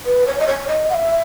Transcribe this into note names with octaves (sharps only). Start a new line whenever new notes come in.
B4
C#5
D#5
C#5
D#5
F#5
E5